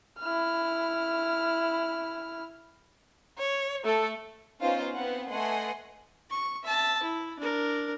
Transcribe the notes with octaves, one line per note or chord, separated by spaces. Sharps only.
E4 F6
C#5
A3 A4
B3 C#4 D#4 F4 C5 F5
B3 C4 B4 F#5
A3 B4 D#5 F#5 G#5 C6
C#6
E5 A5
E4
D4 A#4